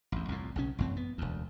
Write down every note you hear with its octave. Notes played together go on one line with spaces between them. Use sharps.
A1 E2
C2 F2 A2
B1 C#3 C#4
A1 F#2 C4
B3
E1 D2